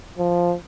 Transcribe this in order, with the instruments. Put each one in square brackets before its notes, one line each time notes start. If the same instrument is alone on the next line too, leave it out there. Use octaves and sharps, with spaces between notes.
[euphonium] F3